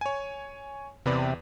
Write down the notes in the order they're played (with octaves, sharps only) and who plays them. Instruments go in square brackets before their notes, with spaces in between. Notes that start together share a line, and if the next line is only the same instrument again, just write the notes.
[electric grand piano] C#5 G#5
[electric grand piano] E2 B4 D5 [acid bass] C3